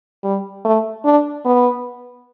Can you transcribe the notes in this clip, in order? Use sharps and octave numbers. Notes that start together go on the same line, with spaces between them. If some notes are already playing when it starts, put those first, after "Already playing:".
G3
A3
D4
B3